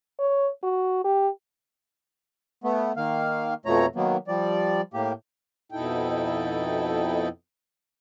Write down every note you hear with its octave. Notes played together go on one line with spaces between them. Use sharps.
C#5
F#4
G4
A3 B3
D#3 A#3 F5
F2 B2 F3 A3 C#5 A#5
D#3 F#3 A#3 B3
F3 G3 D5
A2 A#3 G4
F2 B2 D#4 E4 A4 G5